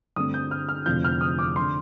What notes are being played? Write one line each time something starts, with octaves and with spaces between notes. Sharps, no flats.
G2 D3 A3 C4 D#6
G6
F6
F6
F1 F2 D3 F3 G6
F6
D#6
D6
D3 C6